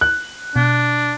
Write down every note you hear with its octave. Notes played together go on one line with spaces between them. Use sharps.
F#6
B2 D4